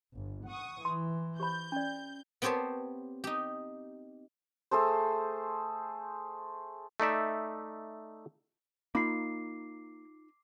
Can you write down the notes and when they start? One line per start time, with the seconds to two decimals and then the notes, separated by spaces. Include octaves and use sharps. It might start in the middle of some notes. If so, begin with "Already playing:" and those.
0.14 G1
0.47 F#5 C#6 D#6
0.85 E3 C6
1.40 G4 C5 B5 G6
1.72 C#4 D5
2.42 B3 C4 G4 C5 C#5 A5
3.24 D#4 G4
4.71 A3 G#4 A4 C5
7.00 A3 D#4 D5 E5
8.95 A#3 D#4 F4 B5 D6 C7